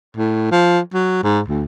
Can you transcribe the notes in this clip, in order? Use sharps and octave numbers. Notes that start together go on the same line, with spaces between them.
A2
F3
F#3
G#2
D2